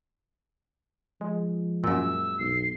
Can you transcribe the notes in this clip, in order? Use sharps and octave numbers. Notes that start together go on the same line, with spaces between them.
F3 G#3
F#2 A#2 E6
B1 C7